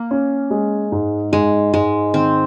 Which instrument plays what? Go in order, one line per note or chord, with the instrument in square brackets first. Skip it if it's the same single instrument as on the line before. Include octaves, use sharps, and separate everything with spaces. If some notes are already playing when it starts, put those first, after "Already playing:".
Already playing: [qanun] A#3
[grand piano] C#4
G#3
G#2
[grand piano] G#2 [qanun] G#3
[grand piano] G#2 [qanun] G#3
[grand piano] D#3 [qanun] C4